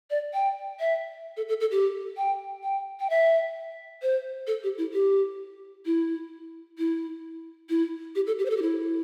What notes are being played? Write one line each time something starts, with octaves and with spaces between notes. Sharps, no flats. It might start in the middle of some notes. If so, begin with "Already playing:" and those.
D5
G5
E5
A4
A4
A4
G4
G5
G5
G5
E5
C5
A4
G4
E4
G4
E4
E4
E4
G4
A4
G4
C5
A4
G4
E4